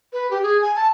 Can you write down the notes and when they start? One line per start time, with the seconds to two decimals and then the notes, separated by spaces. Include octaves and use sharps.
0.13 B4
0.31 G4
0.43 G#4
0.61 G#5
0.76 A5